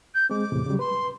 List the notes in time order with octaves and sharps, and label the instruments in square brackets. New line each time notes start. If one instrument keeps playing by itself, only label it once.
[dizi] G6
[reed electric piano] G#3 C4 [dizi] D6
[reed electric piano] E2 A2 C3
C#3 F#3 G3
[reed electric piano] B4 [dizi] C6